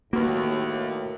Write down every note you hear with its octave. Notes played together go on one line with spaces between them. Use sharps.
D#2 A2 A#3 F#4 B4